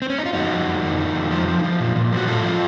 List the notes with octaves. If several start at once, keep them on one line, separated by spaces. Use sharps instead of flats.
C4
C#4
D#4
F4
F2 D#4 F#4
F2
F2
D#3
D#3
F2
F3
F3
F3
A#2
A#2
F3 F#4
A2 F4 A4
F3